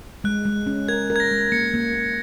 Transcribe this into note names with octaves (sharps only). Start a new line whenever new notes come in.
G#3 F#6
G#3
C#4
A#4 G#6
A#4
G#6
A#6
G#3
A#3 C#7
A#3
A#3